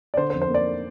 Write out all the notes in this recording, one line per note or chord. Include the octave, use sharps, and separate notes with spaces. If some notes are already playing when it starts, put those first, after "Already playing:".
D5
D3 C5
C5
F2
C5
A#3 D5